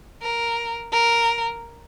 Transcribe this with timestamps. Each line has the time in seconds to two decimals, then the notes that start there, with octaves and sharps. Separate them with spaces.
0.22 A#4
0.92 A#4